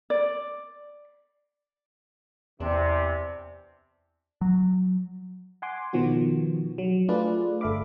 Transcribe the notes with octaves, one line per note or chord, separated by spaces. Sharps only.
D5
E2 C3 E3 D4
F#3
F#5 G#5 C6 D6
B2 D#3 F3 B3 F#4
F#3
A3 D4 F4 G#4 B4 D5
G1 A4 E5 F5 B5 D6